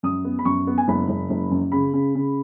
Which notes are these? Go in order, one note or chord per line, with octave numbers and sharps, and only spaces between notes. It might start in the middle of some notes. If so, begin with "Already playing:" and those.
F#2 D#6
B3
B5
F#2 C#6
B3
G#5
F#1 B5
F#1
F#1
F#2
C#3 B5
C#3
C#3